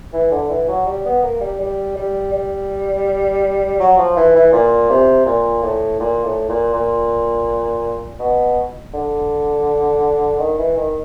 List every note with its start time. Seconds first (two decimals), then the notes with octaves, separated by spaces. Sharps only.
0.13 E3
0.32 D3
0.50 E3
0.69 F#3
0.86 G3
1.05 B3
1.23 A#3
1.41 G3
1.60 G3
1.96 G3
2.33 G3
3.80 F#3
3.98 F3
4.17 E3
4.35 E3
4.52 A#2
4.90 C3
5.26 A#2
5.63 A2
6.00 A#2
6.25 A2
6.49 A#2
6.73 A#2
8.19 B2
8.94 D3
10.39 D#3
10.58 E3
10.77 D#3